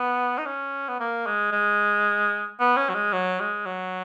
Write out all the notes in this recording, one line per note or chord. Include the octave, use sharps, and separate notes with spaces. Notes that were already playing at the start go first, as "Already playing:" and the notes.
Already playing: B3
D#4
C#4
B3
A#3
G#3
G#3
B3
C#4
F#3
G#3
F#3
G#3
F#3